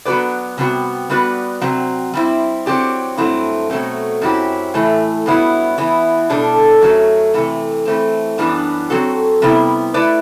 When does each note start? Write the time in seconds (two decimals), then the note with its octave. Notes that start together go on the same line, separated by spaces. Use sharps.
0.05 F#3 B3 F#4 B4 D5
0.58 C3 G3 B3 F#4
1.09 G3 B3 F#4 B4 D5
1.61 C3 F#3 C4
2.14 G3 C4 E4
2.66 F#3 C4 G4 D5
3.17 G2 F#3 A3 C4 E4
3.70 B2 F#3 A3 C4
4.22 F#2 F#3 C4 E4 G4
4.74 A2 E3 A3 E4
5.26 G2 F#3 B3 E4
5.78 E3 B3 E4
6.30 B2 G3 D4 A4
6.81 F#2 F#3 A3
7.34 C3 E3 A3
7.85 E3 A3 C4
8.38 F#2 E3 G3 B3 D4
8.90 F#3 C4 F#4 A4
9.42 C3 G3 B3 E4
9.94 A3 E4 B4 D5